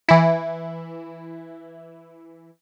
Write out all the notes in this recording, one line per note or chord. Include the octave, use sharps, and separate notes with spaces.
E3 E4